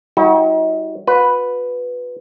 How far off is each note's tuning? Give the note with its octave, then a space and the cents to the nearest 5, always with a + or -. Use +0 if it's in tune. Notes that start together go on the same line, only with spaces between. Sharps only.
G3 +0 D#4 +45 F#4 -15
F#4 -40 B4 +0